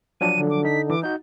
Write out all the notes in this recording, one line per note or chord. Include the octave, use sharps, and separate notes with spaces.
F3 F#3 D4 D#7
D3
D6
D#4 B6
E3 D6
D#4 F#4 G6